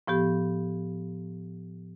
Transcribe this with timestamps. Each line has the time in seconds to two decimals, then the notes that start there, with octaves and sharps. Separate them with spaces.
0.07 A2 F3 B3 G4